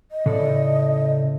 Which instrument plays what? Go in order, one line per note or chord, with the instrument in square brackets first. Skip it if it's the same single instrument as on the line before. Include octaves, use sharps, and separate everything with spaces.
[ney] D#5
[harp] A2 [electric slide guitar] C#3 A4 D5